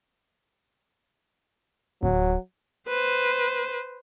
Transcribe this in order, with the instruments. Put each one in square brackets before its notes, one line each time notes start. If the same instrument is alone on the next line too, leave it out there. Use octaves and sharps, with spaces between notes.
[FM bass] D1 [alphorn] F#3
[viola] B4 C5